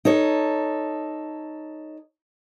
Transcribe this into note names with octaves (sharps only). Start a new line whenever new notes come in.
D#4 A4 C#5